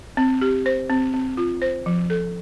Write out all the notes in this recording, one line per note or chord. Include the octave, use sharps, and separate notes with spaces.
C4
G4
C5
C4
C4
F4
C5
F3
A4